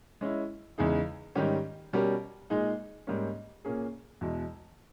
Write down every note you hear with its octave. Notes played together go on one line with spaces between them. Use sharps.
G#3 C#4 E4
E2 C#3 G#3 D#4 G#4
G#2 D#3 G3 C#4 G4
B2 G3 C#4 G4 A#4
A#2 G#3 D#4 G#4
G#2 G3 A#3 C#4
A#2 A#3 C#4 G#4
E2 B2 G#3